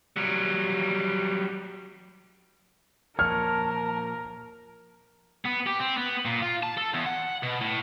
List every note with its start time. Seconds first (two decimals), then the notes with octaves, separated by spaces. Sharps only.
0.16 F#3 G3
3.19 A#2 F3 A#4 C#5 A5 F6
5.46 B3
5.67 G4
5.80 C4
5.97 B3
6.26 A#2
6.42 F4
6.63 A5
6.78 A4
6.94 E2
7.06 F#5
7.43 B2
7.61 A2